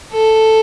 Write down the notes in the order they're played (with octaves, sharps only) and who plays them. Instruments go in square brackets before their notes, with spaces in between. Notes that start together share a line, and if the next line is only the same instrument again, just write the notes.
[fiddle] A4